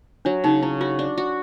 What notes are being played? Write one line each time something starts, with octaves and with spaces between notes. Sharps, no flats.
F#3 D4
C#3 D#4
C#4 E4
F4 F#4
D4
F#4